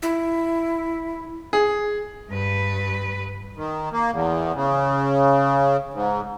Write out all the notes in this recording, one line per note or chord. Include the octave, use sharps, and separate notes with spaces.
E4
G#4
G2 B4
D#3
A#3
E2
C#3
G#2